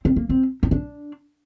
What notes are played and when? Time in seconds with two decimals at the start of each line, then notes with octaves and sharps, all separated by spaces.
0.05 C4
0.16 A#3
0.29 C4
0.63 D#4
0.71 D4